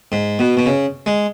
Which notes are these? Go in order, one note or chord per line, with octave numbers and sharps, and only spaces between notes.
G#2
B2
B2
C#3
G#3